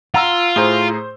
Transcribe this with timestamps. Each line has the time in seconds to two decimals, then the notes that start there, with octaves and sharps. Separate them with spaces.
0.14 F4 F#5 A#5 E6
0.56 A2 G#4 C5 A#5 G7